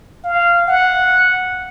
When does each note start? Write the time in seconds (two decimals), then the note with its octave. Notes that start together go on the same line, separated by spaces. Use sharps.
0.24 F5
0.68 F#5